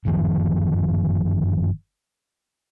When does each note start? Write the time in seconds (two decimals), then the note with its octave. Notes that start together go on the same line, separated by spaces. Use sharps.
0.05 G1 F#2 D#3 F3